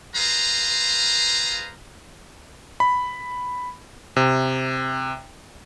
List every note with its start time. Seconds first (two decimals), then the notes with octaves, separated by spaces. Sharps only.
0.16 F4 G#4 B4 C5 F5 A#5
2.80 B5
4.16 C3